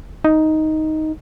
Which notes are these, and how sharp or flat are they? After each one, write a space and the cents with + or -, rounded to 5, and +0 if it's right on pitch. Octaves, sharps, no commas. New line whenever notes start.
D#4 +5